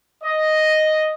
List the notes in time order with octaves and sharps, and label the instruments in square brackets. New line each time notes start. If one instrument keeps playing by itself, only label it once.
[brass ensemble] D#5